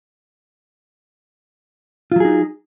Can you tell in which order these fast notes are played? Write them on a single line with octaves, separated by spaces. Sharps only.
F4 F#3 G#4 D#4